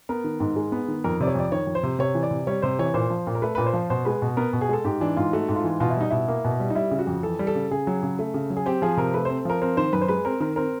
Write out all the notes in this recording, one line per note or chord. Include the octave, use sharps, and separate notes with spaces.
B3 A#4
D#3
G#2
G#3
B3
D#3
F2 A#4
C3 D5
C#5
F2 D5
D#3 C#5
F2
C5
C3
C3 C#5
E3
D5
C3
G3 C#5
C3 C5
E3 C#5
A#2 C5
F3
A#2
A#4
A3 B4
A#2 B4
C5
F3
B2 C5
G#3 B4
B2
B3 A#4
B2
G#4
G#3 A4
G#2 G4
E3 D4
G#2 F4
A3 F#4
G#2
F4
E3
B2 F4
E4
G3 D#4
B2 E4
A#3
B2
G3
D#4
G3 E4
C#3
F#4
F2
E3 A4
G3
A4
C#3
C#3 G#4
F#3
C#3
A3
C#3
F#3
G#4
C4 G4
F3 G#4
C3 A#4
A3 B4
C4 C5
F3 A#4
C4 A#4
D#3 C5
F#2 B4
C5
G#3 B4
C4 A#4
D#3 A#4
C4 A#4